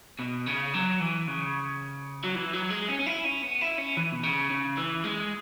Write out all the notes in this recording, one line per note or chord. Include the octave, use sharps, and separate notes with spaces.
B2
C#3
F#3
E3
C#3
F#3
E3
F#3
G#3
C#4
C#4
E4
C#4
B3
E4
C#4
E3
B2
C#3
C#3
E3
G#3